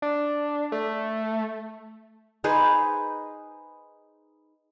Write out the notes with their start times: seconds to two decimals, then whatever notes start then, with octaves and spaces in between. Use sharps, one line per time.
0.02 D4
0.72 A3
2.44 D#4 G#4 B4 C5